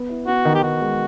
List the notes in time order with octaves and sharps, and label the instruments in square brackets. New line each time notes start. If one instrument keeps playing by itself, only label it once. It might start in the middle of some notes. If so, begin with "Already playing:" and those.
Already playing: [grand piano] B3
E4
[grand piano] B3 [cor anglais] F#4
[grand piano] D#3
[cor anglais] G4
[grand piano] D#3 [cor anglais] F#4
[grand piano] G#3